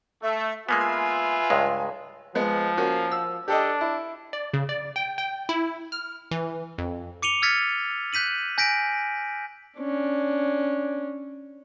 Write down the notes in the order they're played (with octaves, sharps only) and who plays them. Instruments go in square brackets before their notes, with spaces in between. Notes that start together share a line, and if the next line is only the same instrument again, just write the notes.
[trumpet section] A3 [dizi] E5
[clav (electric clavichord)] G#3 A#3 B3 [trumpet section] F4 B4 E5 [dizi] G#5
[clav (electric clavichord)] C#2 G2 G#3
[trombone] F3 [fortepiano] G#3 B3
[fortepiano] A#3 C#4 F#4
E6
[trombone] D4 [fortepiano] G4 A4 D#5
[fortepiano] E4
[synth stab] D5
C#3
D5
G5
G5
E4
F6
E3
F2
[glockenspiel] D6 C#7 D#7 F7 G7
E6 F6 G#6 A6 B6 C#7
F#6 G6 B6 D#7 F#7
G#5 G6 A#6 B6 D7
[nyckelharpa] C#4 D4